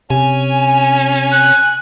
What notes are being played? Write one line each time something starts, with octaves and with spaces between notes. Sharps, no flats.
C3 C#4 G#5
F#6